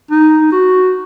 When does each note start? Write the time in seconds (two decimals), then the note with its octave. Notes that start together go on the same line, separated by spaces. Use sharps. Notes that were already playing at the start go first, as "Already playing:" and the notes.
0.11 D#4
0.52 F#4